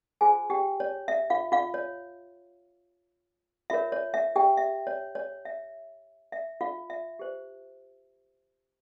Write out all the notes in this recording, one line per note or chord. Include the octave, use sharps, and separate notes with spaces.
F4 G#4 C5 G#5
G4 G5
C#5
E5
F4 F5
F4 F5
C#5
F4 A#4 C#5 E5
C#5
E5
G4 G5
E5
C#5
C#5
E5
E5
F4 F5
E5
G4 C5